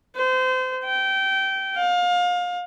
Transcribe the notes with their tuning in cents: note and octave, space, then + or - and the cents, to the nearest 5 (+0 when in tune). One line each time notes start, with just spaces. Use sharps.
C5 -30
G5 -20
F5 +30